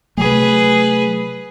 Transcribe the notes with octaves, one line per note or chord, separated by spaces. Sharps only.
C3 F#3 A3 G#4 B4